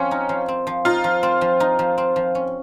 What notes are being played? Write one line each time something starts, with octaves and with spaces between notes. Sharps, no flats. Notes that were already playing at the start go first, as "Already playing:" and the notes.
Already playing: F3 C4 C#4
D#4
F3
C4
F3
D#4 F4
F3
C4
F3
D#4
F3
C4
F3
C#4